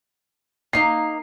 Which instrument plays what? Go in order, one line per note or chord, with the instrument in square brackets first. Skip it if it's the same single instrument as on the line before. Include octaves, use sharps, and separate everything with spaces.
[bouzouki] A#3 D#4 A#5 [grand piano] C7